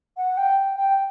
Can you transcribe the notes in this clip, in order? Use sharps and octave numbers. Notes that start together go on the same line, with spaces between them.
F#5
G5
G5